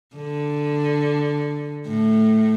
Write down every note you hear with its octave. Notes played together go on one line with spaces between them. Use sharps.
D3
A2